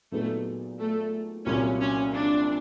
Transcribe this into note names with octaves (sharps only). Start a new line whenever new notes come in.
A#2 F#3 A3 B3 D#4 G#4
A3
C2 A#2 F#3 A#3 C#4
C#4
D4